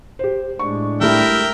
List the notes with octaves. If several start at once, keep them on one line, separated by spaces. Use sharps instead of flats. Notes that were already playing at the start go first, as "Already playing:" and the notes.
G4 C5
A2 G#3 D4 C#6
G3 A3 E4 A#4 E5 G5